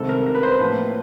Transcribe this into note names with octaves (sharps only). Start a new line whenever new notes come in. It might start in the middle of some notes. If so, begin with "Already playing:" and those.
Already playing: C2 C3 D#3 G#3 C4 A4
A#4
A#4
B4
C5
B4
A2 F3 A#3